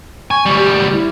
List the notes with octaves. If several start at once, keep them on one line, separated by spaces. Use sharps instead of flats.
G#5 C#6
D2 G3
G4
E4